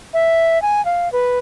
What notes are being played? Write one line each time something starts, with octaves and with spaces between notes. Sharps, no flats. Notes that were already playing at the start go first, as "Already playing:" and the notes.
E5
G#5
F5
B4